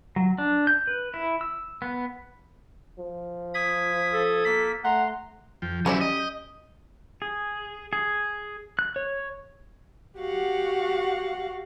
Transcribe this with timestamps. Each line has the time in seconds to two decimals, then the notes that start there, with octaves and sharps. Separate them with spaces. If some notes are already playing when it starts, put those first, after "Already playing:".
0.16 F#3
0.38 D4
0.67 G6
0.87 B4
1.14 E4
1.41 E6
1.82 B3
2.99 F3
3.54 D#6 G#6 B6
4.13 A4
4.45 A#3 B6
4.84 A3 F#5 A#5 C6
5.62 F2 F3 G5
5.86 F#3 C#4 E4 G4 C5 D5
6.01 D#5
7.22 G#4
7.93 G#4
8.79 F#6
8.96 C#5
10.18 F#4 G4 F5 F#5